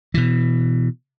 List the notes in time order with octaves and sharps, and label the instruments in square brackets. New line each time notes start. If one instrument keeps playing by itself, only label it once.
[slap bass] B2 E3